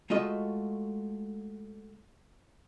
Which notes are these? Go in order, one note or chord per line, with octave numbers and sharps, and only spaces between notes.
G#3 A3 F4 F#4 D#5